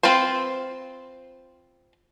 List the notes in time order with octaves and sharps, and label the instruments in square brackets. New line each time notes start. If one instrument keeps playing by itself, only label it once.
[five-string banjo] C4 F4 B4 C5